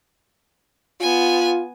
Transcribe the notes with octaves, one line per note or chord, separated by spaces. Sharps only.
B3 F4 G#5